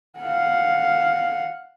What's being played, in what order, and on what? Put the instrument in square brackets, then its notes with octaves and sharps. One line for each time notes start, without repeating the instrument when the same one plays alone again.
[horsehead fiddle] F5 F#5